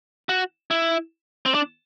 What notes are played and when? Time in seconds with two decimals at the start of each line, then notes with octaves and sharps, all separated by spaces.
0.29 F#4
0.71 E4
1.46 C4
1.54 D4